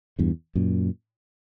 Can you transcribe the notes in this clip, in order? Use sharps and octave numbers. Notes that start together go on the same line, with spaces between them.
E2 G2
F#2 A#2